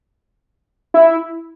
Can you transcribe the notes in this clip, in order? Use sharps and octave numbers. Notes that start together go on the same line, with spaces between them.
E4